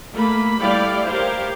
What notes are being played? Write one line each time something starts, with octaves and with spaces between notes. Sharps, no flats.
A3 A#3 B5
G3 A3 E4 D5 F5 G5
G4 A#4 C5 C#5 F5